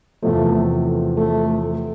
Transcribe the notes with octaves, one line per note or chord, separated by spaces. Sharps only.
E2 C3 F3 A3
A3